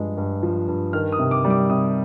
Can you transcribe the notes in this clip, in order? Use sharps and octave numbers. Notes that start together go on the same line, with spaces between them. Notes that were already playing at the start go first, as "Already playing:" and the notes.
Already playing: G2 F3 G#3
G2
F3
G2
D#3 F6
D#6
C3
D6
G3
D6
C3 D#6